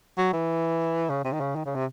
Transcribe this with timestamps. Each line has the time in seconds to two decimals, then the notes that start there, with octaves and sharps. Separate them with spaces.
0.18 F#3
0.33 E3
1.10 C#3
1.25 C3
1.33 D#3
1.40 C#3
1.56 D#3
1.65 C#3
1.75 C3